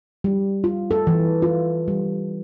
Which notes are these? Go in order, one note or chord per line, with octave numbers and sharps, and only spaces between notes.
G3
F4
A4
E3
F4
G3